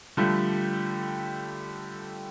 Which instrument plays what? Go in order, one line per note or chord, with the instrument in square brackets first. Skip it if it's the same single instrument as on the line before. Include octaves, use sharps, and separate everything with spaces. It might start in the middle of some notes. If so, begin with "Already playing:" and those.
[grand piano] D3 F3 G3 A3